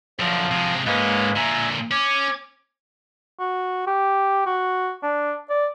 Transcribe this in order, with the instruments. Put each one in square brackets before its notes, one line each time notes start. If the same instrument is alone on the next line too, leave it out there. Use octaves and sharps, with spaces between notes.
[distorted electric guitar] F#2 D3 [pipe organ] F3
[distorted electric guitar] C3 G#3
[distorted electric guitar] G#2 C#4 [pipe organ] G#3 A#3 B4
[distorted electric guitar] A#2 D3 [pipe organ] E5 G#5 A#5
[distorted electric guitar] C#4 [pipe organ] D6 G#6
[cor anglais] F#4
G4
F#4
D4
D5